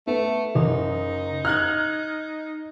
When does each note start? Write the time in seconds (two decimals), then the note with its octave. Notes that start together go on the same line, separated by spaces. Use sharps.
0.07 A3 B3
0.55 F#1 D#4
1.45 F6 F#6 G#6